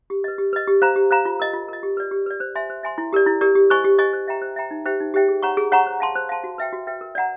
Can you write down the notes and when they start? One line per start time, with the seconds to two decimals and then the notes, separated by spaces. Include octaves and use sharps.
0.10 G4
0.24 B4 D#5
0.38 G4
0.53 B4 D#5
0.68 G4
0.82 C5 F5 A#5
0.96 G4
1.11 C5 F5 A#5
1.25 F4
1.40 A#4 D#5
1.53 F4
1.68 A#4 D#5
1.83 G4
1.97 B4 D5
2.11 G4
2.26 B4 D5
2.40 C5
2.55 E5 G#5 C6
2.70 C5
2.83 E5 G#5 C6
2.98 E4
3.13 G4 A#4 D5
3.26 E4
3.41 G4 A#4 D5
3.55 G4
3.70 C5 D#5 G#5 C#6
3.84 G4
3.99 C5 D#5 G#5 C#6
4.13 C5
4.28 E5 G5 A#5
4.42 C5
4.56 E5 G5 A#5
4.71 D#4
4.86 G4 C5 E5 G5
5.00 D#4
5.14 G4 C5 E5 G5
5.28 G#4
5.43 C#5 F#5 A#5 C#6
5.57 G#4
5.72 C#5 F#5 A#5 C#6
5.87 C5
6.00 F5 A5 C6
6.16 C5
6.29 F5 A5 C6
6.44 F#4
6.58 B4 E5 G5
6.72 F#4
6.87 B4 E5 G5
7.01 A#4
7.15 D5 F#5 A#5